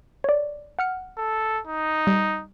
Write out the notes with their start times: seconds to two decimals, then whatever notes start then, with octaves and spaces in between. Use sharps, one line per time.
0.24 C#5 D5
0.79 F#5 F6 C#7
1.18 A4
1.66 D#4
2.07 G3